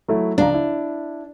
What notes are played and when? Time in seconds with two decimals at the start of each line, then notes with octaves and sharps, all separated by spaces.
0.08 F#3 A3 E4
0.38 C#2 F3 D4 A#5
0.54 E4